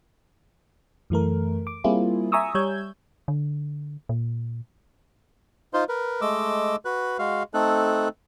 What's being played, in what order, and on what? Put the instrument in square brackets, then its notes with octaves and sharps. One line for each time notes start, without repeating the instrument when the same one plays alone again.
[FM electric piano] F#2 E3 A3 A#4
D6
G3 A#3 C4 E4 F4 G#4
E5 G#5 A#5 C#6 D#6 E6
G3 C#5 E6 G6 G#6
[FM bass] D3
A#2
[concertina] D#4 F4 C5
A#4 B4
G#3 A3 D#5 D6 E6
F#4 B4 F#6
G#3 F#4 F5
A3 C4 D#4 A4 F#6